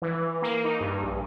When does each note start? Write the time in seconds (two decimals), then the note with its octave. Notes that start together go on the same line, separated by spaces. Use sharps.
0.02 E3
0.42 A#3
0.64 D#4
0.80 G2
1.03 A#1